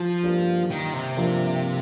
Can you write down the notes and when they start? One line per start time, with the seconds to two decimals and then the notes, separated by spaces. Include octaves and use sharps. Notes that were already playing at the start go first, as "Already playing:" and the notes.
Already playing: F3
0.23 G2 G3 A#3 F4
0.70 D#3
0.93 C3
1.17 G2 F3 A#3 F4